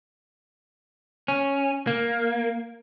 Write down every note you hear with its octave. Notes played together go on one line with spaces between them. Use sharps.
C#4
A#3